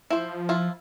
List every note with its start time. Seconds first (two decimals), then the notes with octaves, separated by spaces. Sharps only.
0.10 F3 E4 C5
0.49 E4 F4